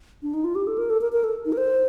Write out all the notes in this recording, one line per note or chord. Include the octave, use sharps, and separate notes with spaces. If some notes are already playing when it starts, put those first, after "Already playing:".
D4
D#4
F4
G4
A4
A#4
A4
A#4
A#4
A4
D#4
A#4
C5